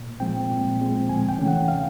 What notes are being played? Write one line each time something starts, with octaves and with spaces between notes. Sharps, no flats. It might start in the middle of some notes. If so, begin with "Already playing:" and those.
Already playing: A#2
F3 G#3 C4 G5
A#2
F3 G#3 C4
D2 G#5
G5
C3 E3 A3 C#4
F#5
F5